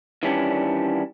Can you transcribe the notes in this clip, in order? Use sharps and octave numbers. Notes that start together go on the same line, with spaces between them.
D#3 E3 G3 C#4 D4